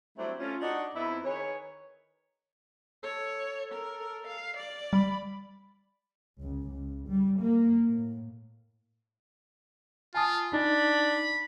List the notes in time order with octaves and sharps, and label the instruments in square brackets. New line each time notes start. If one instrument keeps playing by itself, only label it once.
[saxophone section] F#3 G3 A3 C4 D4 E4
A3 C#4 F4
D4 D#4 F#4
F2 B3 D#4 E4
D#3 G#4 B4 C#5
[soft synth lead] A4 [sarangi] C#5
[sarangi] A#4
F5
D5
[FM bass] G3 [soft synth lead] B5
[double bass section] C#2
C#2
G3
A#3
A2
[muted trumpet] F4 [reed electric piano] G#5 A5 D#6
[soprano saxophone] D4 [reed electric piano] D#4 [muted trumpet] B5